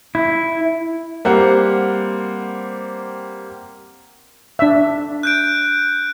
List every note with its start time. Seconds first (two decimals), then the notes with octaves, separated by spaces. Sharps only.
0.15 E4
1.25 G3 A#3 C4 A#4 C5 F#5
4.59 D4 E5
5.23 F#6 G6 D7